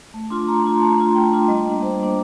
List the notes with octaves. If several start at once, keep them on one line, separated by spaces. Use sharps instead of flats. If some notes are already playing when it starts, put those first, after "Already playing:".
A3
D4 F4 C6
A3 A#5
C6
D4 F4 A#5
A3 A5
D4 F4
A3 G5
D4 F4
G3 D#5
A#3 D4
G3 C5
A#3 D4